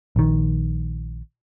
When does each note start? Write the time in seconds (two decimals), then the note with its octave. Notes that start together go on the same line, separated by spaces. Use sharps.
0.16 A#1 D#3